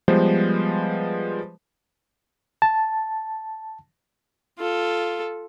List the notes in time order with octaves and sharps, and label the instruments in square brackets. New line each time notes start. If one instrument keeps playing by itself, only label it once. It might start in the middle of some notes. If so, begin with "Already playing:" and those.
[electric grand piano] F3 G3 G#3 B3 B4 C5
[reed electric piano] A5
[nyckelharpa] F4 A4